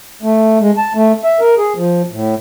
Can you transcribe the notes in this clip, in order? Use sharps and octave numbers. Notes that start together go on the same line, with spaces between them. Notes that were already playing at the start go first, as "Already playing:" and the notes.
A3
G#3
A5
A3
E5
A#4
G#4
F3
A2